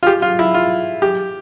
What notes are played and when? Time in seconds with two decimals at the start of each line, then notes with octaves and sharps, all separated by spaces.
0.03 F4
0.07 G4
0.22 F4
0.39 E4
0.54 F4
1.02 G4